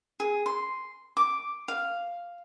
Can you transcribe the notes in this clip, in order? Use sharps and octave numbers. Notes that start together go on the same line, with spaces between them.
G#4
C6
D6
F5